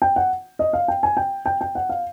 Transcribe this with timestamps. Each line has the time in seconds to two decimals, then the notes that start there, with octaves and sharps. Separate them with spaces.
0.02 G5
0.16 F#5
0.59 D#5
0.73 F5
0.88 G5
1.03 G#5
1.17 G5
1.46 G5
1.61 G5
1.75 F#5
1.90 F5